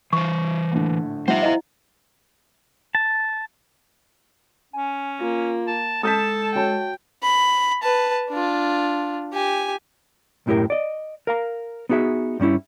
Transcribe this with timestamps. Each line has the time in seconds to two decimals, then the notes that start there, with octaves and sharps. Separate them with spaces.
0.13 E3 C5 C#6
0.72 A#1 A2 D3
1.28 F3 G3 D#4 C5 E5 F#5
1.42 E4 D#5 F5
2.95 A5
4.73 C#4 G#5
5.21 A#3 F4
5.67 A5
6.03 G#3 A4 A5 D#6 G6 B6
6.55 F#4 C#5 G5 A5
7.23 B5
7.83 B4 A5
8.29 D4 F4
9.33 G4 G#5
10.46 B1 F#2 A2 E4 G4 A#4
10.70 D5 D#5
11.27 A#4 F5 A#5
11.89 B3 D#4 F#4 G#4 E5
12.39 G2 G3 C#4 E4